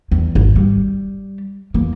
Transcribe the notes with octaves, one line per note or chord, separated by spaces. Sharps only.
E2
G#1
G3
E2 A#3